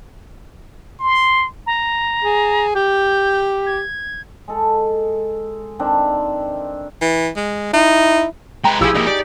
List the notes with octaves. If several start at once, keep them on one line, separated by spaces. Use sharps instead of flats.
C6
A#5
G#4
G4 G6
G#6
G#3 A4
D#3 C4 D4
E3
G#3
D#4 E4
G#3 B4 G5 A#5
A#1 F3 E4 G4 G#4 E6
F3 A#3 D#4 G4
G4 D5